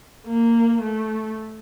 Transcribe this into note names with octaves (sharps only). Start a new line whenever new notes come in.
A#3
A3